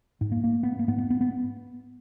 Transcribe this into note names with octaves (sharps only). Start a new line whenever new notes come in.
G#2
A#3
A#3
B3
A#3
G#2 B3
B3
B3
B3